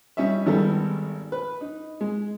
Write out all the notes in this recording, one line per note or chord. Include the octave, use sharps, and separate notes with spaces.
G3 C#4 D#4 E5
G#1 D#3 G3 B3 A4
B4
D#4
G#3